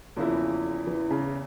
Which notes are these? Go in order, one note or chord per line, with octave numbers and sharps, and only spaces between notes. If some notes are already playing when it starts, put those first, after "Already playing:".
E2 C#3 E3 F3 A#3 E4
E3
C#3